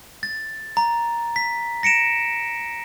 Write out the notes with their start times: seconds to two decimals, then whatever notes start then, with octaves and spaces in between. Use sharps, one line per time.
0.23 A6
0.77 A#5
1.36 B6
1.83 A#6 C#7 D7 E7